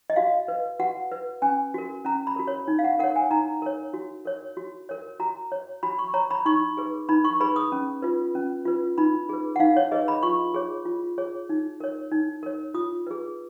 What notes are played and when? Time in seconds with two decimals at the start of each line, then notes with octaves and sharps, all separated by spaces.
0.10 D#5
0.16 F#4 F5
0.48 B4
0.80 F#4 F#5
1.12 B4
1.42 C#4 G#5
1.74 F#4 A#4
2.05 C#4 A#5
2.27 B5
2.36 F#4 A#4
2.47 C#5
2.68 D#4
2.79 F5
2.84 F#5
2.99 A#4 C#5 F#5
3.16 G#5
3.31 D#4 A#5
3.62 A#4 C#5
3.94 F#4
4.25 A#4 C#5
4.57 F#4
4.89 A#4 C#5
5.20 F#4 A#5
5.52 C#5
5.83 F#4 B5
5.99 C#6
6.14 C#5 A#5
6.31 B5
6.46 D#4 C#6
6.77 G#4 B4
7.09 D#4 B5
7.24 C#6
7.40 G#4 B4 B5
7.56 D#6
7.72 C#4
8.02 F4 B4
8.35 C#4
8.65 F4 B4
8.98 D#4 B5
9.29 G#4 B4
9.56 F#5
9.60 D#4 F5
9.77 C#5
9.92 G#4 B4 D#5
10.08 B5
10.23 F4 C#6
10.54 G#4 C#5
10.85 F4
11.18 G#4 C#5
11.49 D#4
11.80 A#4 C#5
12.11 D#4
12.43 A#4 C#5
12.74 F4 D#6
13.07 G#4 B4